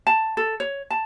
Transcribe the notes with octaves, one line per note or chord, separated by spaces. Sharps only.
A5
A4
C#5
A5